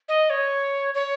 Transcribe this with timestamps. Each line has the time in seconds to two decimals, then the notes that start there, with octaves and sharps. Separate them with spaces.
0.08 D#5
0.29 C#5
0.94 C#5